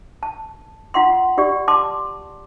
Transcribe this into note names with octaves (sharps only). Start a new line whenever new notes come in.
A5
F4 F#5 C6
F#4 G4 D5
A5 C6 D6